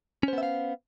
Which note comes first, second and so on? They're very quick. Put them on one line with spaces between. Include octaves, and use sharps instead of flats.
C#4 C5 B3 E5 F5